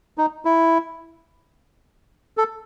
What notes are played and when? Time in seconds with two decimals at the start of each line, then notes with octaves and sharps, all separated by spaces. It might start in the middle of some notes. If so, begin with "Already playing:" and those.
0.18 D#4
0.45 E4
2.37 A4